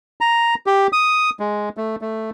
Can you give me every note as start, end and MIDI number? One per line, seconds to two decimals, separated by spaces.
0.21 0.55 82
0.67 0.87 67
0.93 1.30 87
1.40 1.69 56
1.77 1.96 57
2.01 2.30 57